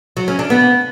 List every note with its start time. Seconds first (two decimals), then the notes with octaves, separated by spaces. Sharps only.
0.17 F#3
0.28 C#4
0.39 D4
0.50 B3